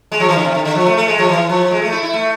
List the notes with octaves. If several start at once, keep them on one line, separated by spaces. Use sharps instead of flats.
G#3
F3
E3
D3
C3
D3
D3
F3
A3
A3
G#3
F3
E3
F3
G#3
A3
E4
E4
A3